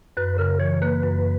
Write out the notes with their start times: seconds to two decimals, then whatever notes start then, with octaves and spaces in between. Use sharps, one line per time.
0.17 F#2 B4
0.38 C#3 A#4
0.60 E3 C#5
0.82 A#3 B4
1.04 F#2